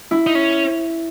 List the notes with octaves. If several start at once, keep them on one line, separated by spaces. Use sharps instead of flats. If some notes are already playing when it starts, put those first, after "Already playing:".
E4
D#4
C#4